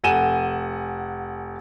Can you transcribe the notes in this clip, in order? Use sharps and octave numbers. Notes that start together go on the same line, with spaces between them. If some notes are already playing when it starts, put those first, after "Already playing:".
F1 F#5 G#5 D#7 E7 G7